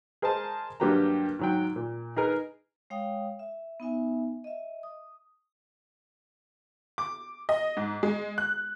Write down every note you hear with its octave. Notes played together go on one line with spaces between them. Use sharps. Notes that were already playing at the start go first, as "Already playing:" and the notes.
G#4 A#4 C5 D#5 G#5 A5
G2 F#3 A#3 G4 B4 A#5
G#2 F#3 G5
A#2
D#4 G#4 A#4 B4
G#3 C#5 F5 G5 D#6
E5
B3 D#4 E5 G#5
D#5 E5
D#6
D6
D#5
G#2
G#3
F#6